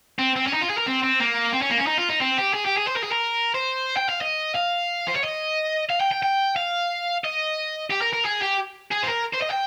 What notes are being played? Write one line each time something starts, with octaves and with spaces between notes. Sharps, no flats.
C4
C4
C#4
D#4
F4
G#4
A#4
C4
C4
A#3
C4
C#4
A#3
C#4
D#4
F4
D#4
C4
G4
G#4
G4
G#4
C5
A#4
G#4
A#4
C5
G5
F5
D#5
F5
C5
C#5
D#5
F5
G5
G5
G5
F5
D#5
G4
A#4
A#4
G#4
G4
G#4
C5
A#4
C5
D#5
G5